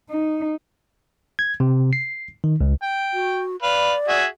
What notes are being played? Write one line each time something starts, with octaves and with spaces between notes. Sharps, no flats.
D#4
G#6
C3
C7
D#3
C#2
G5
F#4
B4 D5 F5
F#4 G#4 E5